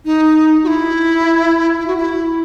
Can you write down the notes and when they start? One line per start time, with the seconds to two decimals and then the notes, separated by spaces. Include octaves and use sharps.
0.05 D#4
0.63 F#4
0.67 E4
1.80 E4
1.87 F#4
1.97 E4